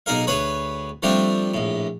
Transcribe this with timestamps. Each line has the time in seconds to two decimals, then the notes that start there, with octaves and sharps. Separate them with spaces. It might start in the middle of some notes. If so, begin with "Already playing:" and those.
0.06 B1 D#4 G#4 A#4 F5
0.27 D2 G#4 B4 C#5 B5
1.03 F3 G3 A3 C4 D4
1.54 A#1 A2